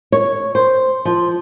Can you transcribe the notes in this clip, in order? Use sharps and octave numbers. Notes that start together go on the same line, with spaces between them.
C#5
C5
F3